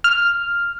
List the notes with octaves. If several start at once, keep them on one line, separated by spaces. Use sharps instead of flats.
F6